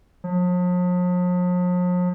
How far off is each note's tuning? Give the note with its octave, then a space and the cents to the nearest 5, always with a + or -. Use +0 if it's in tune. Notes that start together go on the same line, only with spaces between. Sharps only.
F3 +45